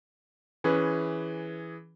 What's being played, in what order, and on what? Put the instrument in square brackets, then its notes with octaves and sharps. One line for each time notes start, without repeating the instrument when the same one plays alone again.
[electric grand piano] E3 G#4 [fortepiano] C#4 B4